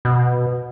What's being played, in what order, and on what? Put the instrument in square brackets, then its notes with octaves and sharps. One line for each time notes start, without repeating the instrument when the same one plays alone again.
[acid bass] B2